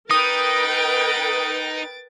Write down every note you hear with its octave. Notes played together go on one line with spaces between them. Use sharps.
D#4 A#4 B4 G5 D#6 A6 D7